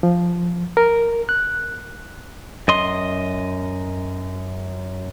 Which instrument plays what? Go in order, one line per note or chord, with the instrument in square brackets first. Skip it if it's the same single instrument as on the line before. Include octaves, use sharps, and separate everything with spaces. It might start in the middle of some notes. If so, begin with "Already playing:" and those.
[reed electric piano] F3
A#4
F#6
[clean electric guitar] F#2 D#5 C6